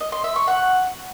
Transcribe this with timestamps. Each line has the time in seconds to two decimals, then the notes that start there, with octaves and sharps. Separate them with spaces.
0.01 D#5
0.12 C6
0.24 E5
0.36 C#6
0.48 F#5